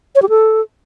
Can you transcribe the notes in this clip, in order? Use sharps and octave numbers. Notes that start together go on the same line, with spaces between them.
C#5
G4
A4